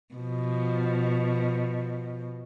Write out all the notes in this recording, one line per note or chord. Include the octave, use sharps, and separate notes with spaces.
B2 F3